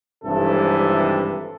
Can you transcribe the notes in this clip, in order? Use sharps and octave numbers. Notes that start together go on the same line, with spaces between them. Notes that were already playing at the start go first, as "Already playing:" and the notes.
G#1 G2 C3 E3 A4